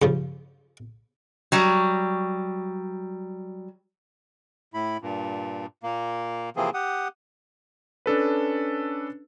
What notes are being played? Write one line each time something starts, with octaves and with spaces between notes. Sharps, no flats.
G2 C#3 F3
F#3 G3
A2 E4 B5
G2 A#2
A#2 A#3
C3 E3 F3 A#3 C4 G#4
G4 F#5 D#6
C#4 D4 A4 B4